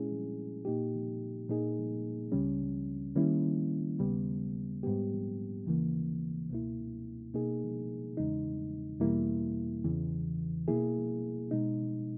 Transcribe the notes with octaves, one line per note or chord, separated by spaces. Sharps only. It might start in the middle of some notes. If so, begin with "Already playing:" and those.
Already playing: A#2 G#3 C#4 E4 G#4
A#2 A#3 D#4 G4
A#2 A#3 D#4 G#4
C#2 C#3 G3 C#4
D#3 G3 A#3 C#4 E4
D#2 C#3 G3 B3
G#2 G3 B3 G4
D#2 C#3 E3 A#3
C#2 B2 A#3 E4
B2 A#3 D#4 G#4
E2 C#3 G#3 D#4
E2 B2 G3 A#3 E4
E2 C#3 E3
B2 A#3 E4 G#4
B2 G#3 D#4